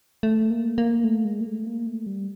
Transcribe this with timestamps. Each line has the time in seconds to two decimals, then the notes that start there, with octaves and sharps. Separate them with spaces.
0.23 A3
0.51 A#3
0.78 A#3
1.04 A3
1.25 G#3
1.41 A#3
1.46 A3
1.67 A#3
1.87 A3
2.06 G3